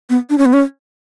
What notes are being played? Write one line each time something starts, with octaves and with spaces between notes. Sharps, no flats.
B3
D4
C#4
B3
C#4